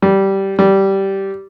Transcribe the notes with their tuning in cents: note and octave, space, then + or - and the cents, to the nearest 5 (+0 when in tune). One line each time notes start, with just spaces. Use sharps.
G3 -10
G3 -10